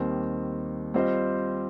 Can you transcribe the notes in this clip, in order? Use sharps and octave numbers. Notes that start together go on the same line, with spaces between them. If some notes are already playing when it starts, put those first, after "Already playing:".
Already playing: D#2 D#3 G3 C4
G3 C4 F4 C5 D#5